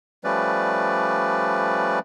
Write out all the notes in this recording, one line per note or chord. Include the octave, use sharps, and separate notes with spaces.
F3 G3 A3 C#4 B4 D5